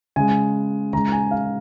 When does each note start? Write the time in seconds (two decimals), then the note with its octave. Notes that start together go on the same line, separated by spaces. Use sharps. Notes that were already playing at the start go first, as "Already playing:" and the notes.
0.16 C#3 G#3 G#5
0.93 C#3 G#3 A#5
1.12 G#5
1.31 F5